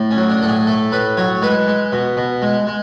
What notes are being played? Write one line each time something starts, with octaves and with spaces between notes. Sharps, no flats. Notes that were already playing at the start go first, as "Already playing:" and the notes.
Already playing: A2
C#4
F#3
D4
A2 A4
G#4
A3 A4
A2 B4
F#3 C#5
G#3 B4
G#3
B2
B2
G#3
G#3